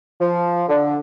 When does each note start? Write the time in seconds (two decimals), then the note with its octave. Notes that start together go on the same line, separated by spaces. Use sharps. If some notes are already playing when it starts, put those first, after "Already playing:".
0.21 F3
0.69 D3